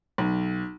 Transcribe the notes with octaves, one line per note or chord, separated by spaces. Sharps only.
B1